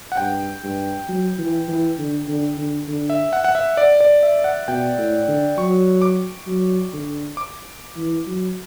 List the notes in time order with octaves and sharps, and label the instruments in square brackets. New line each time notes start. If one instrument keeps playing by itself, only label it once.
[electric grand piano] F#5
[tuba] G2 [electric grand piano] G5
[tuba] G2
F#3
E3
E3
D3
D3
D3
D3
[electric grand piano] E5
F#5
F#5
E5
D5
D5
E5
F#5
[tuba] B2 [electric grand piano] G5
[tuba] A2
D3
[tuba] F#3 [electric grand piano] C#6
[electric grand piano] D6
[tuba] F#3
D3
[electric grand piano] D6
[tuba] E3
F#3